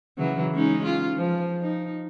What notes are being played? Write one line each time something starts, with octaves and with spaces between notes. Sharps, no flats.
C#3 E3 F#3
G#3 C#4 D#4
F4
F3
D#4